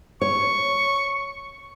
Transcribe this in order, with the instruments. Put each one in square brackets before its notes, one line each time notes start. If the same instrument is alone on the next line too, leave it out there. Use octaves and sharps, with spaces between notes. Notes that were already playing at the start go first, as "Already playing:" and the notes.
[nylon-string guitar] C#5 [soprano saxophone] C#6